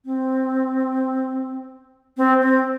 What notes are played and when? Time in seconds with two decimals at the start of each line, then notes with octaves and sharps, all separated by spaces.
0.05 C4
2.17 C4
2.41 C4